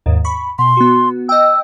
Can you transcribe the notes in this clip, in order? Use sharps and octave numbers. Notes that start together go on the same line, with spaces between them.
D#2 G#2
B5 C#6
B2 C6
B3 F#4
D#5 G5 E6